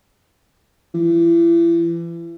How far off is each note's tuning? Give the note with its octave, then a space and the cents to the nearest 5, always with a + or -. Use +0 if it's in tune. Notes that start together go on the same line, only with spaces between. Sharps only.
E3 +35